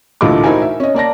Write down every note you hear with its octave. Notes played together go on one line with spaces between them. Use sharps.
D2 A#2 E3 A3 D#5 D6
D#4 E4 F#4 A#4 C5 G#5
E5
C#4 D#5
A#3 D5 A5 A#6